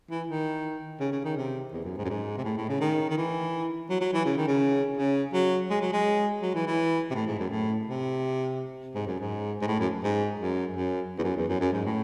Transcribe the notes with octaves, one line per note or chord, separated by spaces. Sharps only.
E3
D#3
C#3
C#3
D#3
C3
E2
F#2
G#2
F#2
G#2
C3
A2
A2
C#3
D#3
D#3
E3
F#3
F#3
E3
C#3
D#3
C#3
C#3
F#3
G#3
F#3
G#3
F#3
E3
E3
C3
A2
G#2
F#2
A2
C3
G#2
F#2
G#2
G#2
A2
F#2
G#2
F#2
F#2
E2
F#2
E2
F#2
F#2
G#2
A2